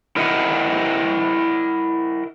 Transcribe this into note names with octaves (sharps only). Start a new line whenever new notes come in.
E4 A#4 D#5 E5 F#5